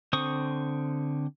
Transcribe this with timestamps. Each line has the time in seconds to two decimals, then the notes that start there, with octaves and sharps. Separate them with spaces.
0.13 D3 C4 C5 C#6 D#6